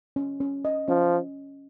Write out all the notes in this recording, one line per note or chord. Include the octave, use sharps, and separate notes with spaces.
C#4
C#4
D#5
F3 C#4